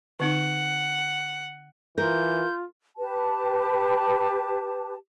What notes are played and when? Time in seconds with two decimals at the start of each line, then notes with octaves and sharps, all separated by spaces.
0.20 D3 C4 D#4 F#5
1.98 E3 F4 A#4 G6
2.98 G4 B4 A5